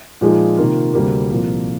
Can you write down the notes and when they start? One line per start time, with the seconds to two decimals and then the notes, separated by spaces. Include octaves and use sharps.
0.21 A#2 F3 G#3 D#4 G#4
0.57 C3 D#3 A#3 F4
0.94 D2 C3 G3 A#3
1.30 C2 A#2 F3 A#3